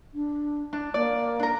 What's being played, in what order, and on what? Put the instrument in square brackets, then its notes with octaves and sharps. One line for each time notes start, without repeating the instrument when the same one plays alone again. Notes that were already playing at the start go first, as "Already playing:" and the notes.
[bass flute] D4
[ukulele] D4
[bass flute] A#3 [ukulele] D5
[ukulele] D4 A#4